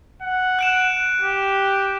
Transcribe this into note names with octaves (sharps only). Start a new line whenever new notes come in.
F#5
F#6 D7 E7
G4